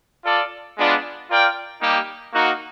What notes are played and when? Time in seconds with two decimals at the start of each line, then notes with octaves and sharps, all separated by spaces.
0.25 F4 A4 D5
0.77 G#3 B3 D4 F4
1.29 F4 A#4 D5 G5
1.81 G3 A#3 D#4 G4
2.33 A#3 D#4 F#4